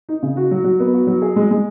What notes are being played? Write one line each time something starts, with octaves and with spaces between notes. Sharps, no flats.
D#4
C#3
F#4
F#3
F#3
B3
F#4
F#3
G#4
G#3
G#3